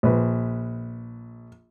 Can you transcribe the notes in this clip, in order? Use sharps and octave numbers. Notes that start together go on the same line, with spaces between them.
A#1 B4